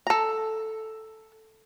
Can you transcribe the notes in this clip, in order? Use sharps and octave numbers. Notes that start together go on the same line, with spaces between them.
A4 A#5